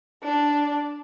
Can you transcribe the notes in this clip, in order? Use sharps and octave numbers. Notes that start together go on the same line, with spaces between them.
D4